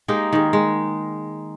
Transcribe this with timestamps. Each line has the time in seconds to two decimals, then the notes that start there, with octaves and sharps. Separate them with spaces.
0.08 G#3 A#3 D#4 G4
0.33 D#3 G#4
0.53 G#3